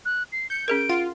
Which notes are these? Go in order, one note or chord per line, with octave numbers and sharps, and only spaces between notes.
F#6
C7
G6 C#7
C#4 G#4 A#4 D7
F4 F#5